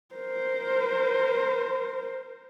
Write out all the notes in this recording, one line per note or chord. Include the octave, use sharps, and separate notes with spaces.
A#4 C5